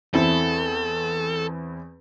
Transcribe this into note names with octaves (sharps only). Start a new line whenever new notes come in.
E2 C4 E4 A4